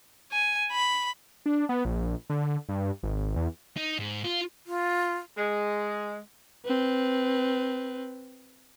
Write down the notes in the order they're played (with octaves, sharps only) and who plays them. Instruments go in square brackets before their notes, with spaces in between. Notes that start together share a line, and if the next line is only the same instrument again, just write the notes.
[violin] G#5
B5
[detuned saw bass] D4
B3
A#1
D3
G2
G#1
E2
[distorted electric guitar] D#4
G#2
F4
[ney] F4
[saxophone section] G#3
[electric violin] C4 B4